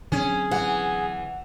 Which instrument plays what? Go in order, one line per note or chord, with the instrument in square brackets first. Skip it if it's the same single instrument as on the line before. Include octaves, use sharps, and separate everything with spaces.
[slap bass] D3 F#3 C4 [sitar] C#4 [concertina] G#4
[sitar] E3 [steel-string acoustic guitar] F#5